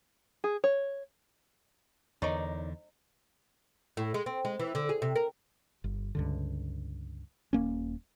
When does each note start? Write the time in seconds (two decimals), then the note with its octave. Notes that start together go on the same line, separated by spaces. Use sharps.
0.44 G#4
0.64 C#5
2.22 E2 D3 D#4 A#4 C#5 D5
3.97 A2
4.14 G#3
4.26 C4
4.45 G#3
4.59 E3
4.75 D3
4.89 G#4
5.02 C3
5.15 A#4
5.84 G1
6.15 C#2 G2 D3
7.53 D#1 A#3 C#4